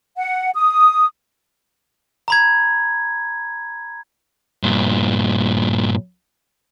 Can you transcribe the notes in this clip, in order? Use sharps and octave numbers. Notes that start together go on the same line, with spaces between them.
F#5
D#6
A#5 B5 G#6
G2 A#2